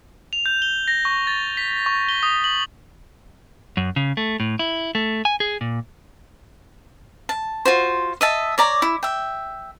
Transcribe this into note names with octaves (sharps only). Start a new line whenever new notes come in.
F7
G6
G7
A#6
C#6
A6
B6
C#6
G7
D#6
F#7
F#2
C#3
A3
A2
E4
A3
G#5
G#4
A#2
A5
F4 F#4 C5
D#5 E5 A5
C#5 D5 A#5
E4
E5 G5